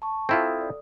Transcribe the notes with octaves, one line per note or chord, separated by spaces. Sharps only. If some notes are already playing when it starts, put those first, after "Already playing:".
A5 C#6
C4 E4 F4 A4 D#6
D5